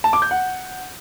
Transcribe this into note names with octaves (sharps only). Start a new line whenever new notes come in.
A5
D6
G6
F#5